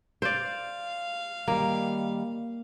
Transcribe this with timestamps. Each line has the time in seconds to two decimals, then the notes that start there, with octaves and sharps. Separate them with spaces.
0.22 C5 D5 F5
1.48 D#3 G3 A#3